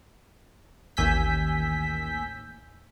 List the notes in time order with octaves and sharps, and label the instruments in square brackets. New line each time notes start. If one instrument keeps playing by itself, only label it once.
[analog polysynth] A1 D#2 G#5 E6 G6 B6